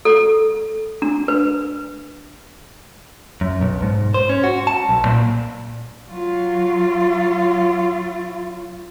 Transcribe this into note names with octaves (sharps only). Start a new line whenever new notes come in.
A4
D4
B4
F#2
B1
G#2
C5
C#4
F#4
A5
B1
A#2
F#3 F4